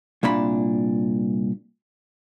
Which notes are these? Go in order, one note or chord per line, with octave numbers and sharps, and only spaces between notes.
C2 A#2 D4 B5